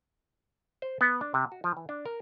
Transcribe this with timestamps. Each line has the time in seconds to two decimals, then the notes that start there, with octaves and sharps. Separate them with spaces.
0.82 C5
1.01 B3
1.21 D4
1.34 C3
1.52 F#4
1.64 F3
1.77 E3
1.89 D4
2.06 A#4